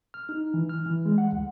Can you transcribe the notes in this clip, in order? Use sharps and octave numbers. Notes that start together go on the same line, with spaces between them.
F6
D#4
E3
F6
E3
G#3
F#5
D2